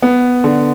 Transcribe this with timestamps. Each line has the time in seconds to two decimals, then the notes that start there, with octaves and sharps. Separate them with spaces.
0.02 B3
0.44 D3